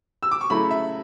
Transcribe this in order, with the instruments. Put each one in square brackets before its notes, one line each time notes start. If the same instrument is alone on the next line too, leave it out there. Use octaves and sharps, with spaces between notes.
[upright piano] E6
D6
C#6
C#3 F#3 A3 E4 B5
E5